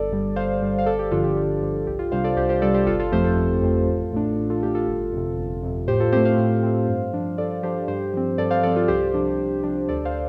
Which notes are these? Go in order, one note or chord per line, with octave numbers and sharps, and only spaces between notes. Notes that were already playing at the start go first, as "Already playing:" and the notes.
Already playing: G1 A4 D5
G2 G3
G1 C5 F5
G2 G3
F5
G1 A4 D5
G4
G2 D3 F3 D4 F4 A4
G4
G1 F4
G2 D3 F3 D4
C2 G4
F4
C3 G3 D4 C5 F5
A4 D5
C2 G4 C5
G4 C5
C3 G3 D4 A4 D5
G4 C5
G1 F4 A4
F4 A4
F2 F3 A3 C4 G4 C5
F4 A4
G1
F2 F3 A3 C4
A1
A2 A3 D4
A1
F4 A4
A2 A3 D4 G4
F4 A4
G1
F2 C3
G1
F2 C3
A2 G4 C5
F4 A4
A3 C4 G4 C5
C5 F5
A2
A3 C4
G2
F3 D4
G2 A4 D5
F3 D4 G4 C5
G2 G4 C5
F3 C4
G2 A4 D5
C5 F5
F3 C4 A4 D5
F4 A4
C2 G4 C5
C3 F3 D4
C2
C3 F3 D4
D2 A4 D5
C5 F5